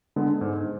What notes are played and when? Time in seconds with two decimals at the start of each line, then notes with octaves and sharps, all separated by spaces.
0.16 D3 G#3 B3
0.41 G#2